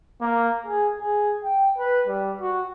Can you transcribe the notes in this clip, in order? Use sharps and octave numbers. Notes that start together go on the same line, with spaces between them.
A#3
G#4
G#4
G5
B4
G3
F#4